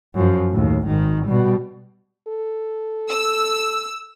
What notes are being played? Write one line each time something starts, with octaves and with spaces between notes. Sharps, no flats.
F#2 F3
D#2 A2
G#1 D#3
B2 G3
A4
E6